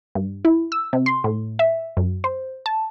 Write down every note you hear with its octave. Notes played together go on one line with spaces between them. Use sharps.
G2
E4
E6
C3
C6
A2
E5
F#2
C5
A5